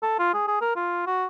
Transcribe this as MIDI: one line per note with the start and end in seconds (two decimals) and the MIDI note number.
0.02 0.18 69
0.19 0.33 65
0.33 0.46 68
0.48 0.60 68
0.61 0.74 70
0.76 1.05 65
1.06 1.26 66